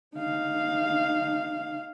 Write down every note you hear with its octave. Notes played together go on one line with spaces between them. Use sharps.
D#4 F5